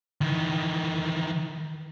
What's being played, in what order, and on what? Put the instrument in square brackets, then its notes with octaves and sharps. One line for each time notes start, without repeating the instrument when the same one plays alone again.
[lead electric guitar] D#3 E3